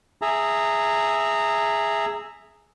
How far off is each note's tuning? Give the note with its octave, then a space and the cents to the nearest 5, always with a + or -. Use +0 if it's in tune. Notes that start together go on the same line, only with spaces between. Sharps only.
G#4 +0 E5 +0 A#5 -20